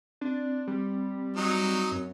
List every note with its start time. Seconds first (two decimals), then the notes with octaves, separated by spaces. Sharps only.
0.21 C4 D4
0.67 G3
1.37 F#3 D#4
1.91 F#2